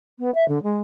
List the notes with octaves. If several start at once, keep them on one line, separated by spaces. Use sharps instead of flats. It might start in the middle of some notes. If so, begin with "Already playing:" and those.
B3
E5
D3
G#3